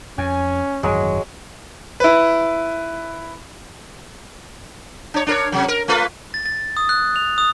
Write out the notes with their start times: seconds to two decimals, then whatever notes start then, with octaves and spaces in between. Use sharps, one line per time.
0.18 F2 C#4 G#5
0.83 G#1 F#2 E3 F#3 G#3
2.00 E4 B4
5.14 D4 C#5
5.27 D4 A#4 C#5
5.52 C3 F#3
5.68 A#4
5.88 A3 F4 B4
6.34 A6
6.46 A6
6.77 D#6
6.89 F#6
7.16 F7
7.38 D#6